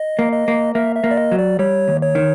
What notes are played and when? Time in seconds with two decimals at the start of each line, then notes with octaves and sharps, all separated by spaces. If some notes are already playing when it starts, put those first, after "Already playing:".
Already playing: D#5
0.19 A#3
0.33 D#5
0.48 A#3
0.75 A#3 E5
0.96 E5
1.04 A#3
1.11 D5
1.18 D#5
1.31 F#3
1.39 D5
1.59 G3 C#5
1.88 D#2
2.02 C#5
2.15 D#3